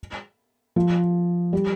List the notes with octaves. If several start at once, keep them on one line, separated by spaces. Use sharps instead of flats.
F3
G3